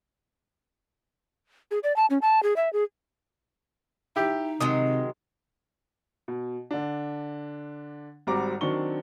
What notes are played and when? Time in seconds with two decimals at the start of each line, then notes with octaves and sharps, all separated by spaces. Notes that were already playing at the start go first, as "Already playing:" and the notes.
1.71 G#4
1.83 D5
1.96 A5
2.10 C#4
2.22 A5
2.43 G#4
2.56 E5
2.73 G#4
4.16 D#4 E4 G4
4.60 C3 D#3 F#3 G#3 D#6
6.28 B2
6.71 D3 D4
8.27 G#1 G3 C4 F#4 A#5 D6
8.61 D#3 F#3 C4 D4 C#6 G7